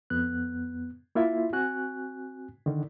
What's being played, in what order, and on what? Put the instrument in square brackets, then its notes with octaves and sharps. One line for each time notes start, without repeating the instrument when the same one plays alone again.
[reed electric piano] F2 B3 F#6
A#3 E4 F4 E5
C4 F#4 G#5 F#6
D3 D#3